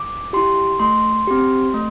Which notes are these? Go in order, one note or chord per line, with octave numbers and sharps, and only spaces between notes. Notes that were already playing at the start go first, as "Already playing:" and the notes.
Already playing: D6
E4 G4 C6
A3 C6
C4 G4
A3